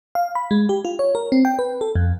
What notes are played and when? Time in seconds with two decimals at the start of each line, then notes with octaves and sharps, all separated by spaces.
0.15 F5
0.35 B5
0.51 G#3
0.69 G4
0.85 F4
0.99 C#5
1.15 A#4
1.32 C4
1.45 G5
1.59 B4
1.81 A4
1.95 F2